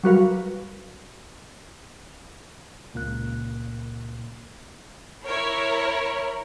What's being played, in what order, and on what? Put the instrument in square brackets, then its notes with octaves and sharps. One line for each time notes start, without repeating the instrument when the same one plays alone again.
[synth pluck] F#3 G3 F#4 A#4 B4 F5
[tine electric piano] C#2 A#2 A#3 F#6
[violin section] E4 A#4 C#5